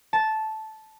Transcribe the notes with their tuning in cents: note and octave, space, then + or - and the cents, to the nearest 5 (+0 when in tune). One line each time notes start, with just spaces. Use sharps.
A5 -10